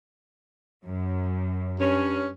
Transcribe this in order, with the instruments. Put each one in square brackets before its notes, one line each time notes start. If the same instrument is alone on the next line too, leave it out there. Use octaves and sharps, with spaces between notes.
[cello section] F#2
[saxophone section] G2 C#4